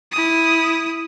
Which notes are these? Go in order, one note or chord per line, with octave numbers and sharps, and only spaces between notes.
E4 D#6